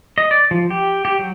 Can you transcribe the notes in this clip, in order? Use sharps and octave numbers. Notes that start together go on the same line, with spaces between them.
D#5
D5
F3
G4
G4
F#3